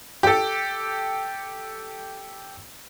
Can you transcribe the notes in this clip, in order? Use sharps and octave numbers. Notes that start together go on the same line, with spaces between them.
G4 A4